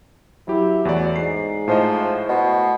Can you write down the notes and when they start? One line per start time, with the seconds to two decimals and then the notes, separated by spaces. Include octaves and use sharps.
0.48 F#3 E4 G4
0.85 E2 A2 F#4 D5
1.16 G#2 C7
1.68 A2 F3 C5 D#5
2.29 B2